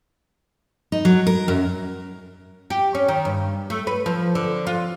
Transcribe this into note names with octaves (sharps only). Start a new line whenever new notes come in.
D#4
F#3
A#4
F#2
G4
C#4
D#3
G2
A3
B4
F3
D3
F4